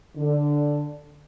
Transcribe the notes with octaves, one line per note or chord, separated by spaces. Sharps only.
D3